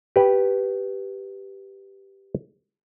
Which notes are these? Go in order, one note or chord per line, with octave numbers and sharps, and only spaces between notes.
G4 B4